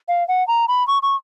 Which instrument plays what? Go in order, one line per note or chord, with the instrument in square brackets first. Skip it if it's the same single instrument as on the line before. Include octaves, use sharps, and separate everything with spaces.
[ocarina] F5
F#5
A#5
B5
C#6
C#6